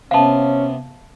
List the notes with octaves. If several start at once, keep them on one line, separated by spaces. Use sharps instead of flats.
C3 B3 C#4 F5 A5